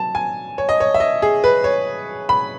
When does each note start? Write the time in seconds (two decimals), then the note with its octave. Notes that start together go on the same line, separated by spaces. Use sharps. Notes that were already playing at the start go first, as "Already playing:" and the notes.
Already playing: F#3 A5
0.15 G#5
0.58 C#5
0.69 D#5
0.80 C#5
0.94 E5
1.00 D#5
1.22 G#4
1.44 B4
1.64 C#5
2.29 B5